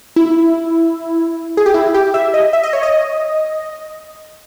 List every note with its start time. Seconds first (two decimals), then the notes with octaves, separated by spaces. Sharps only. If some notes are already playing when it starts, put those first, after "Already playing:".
0.16 E4
1.57 G#4
1.66 G4
1.74 E4
1.94 G4
2.14 E5
2.34 D#5
2.53 E5
2.63 D#5
2.73 C#5
2.83 D#5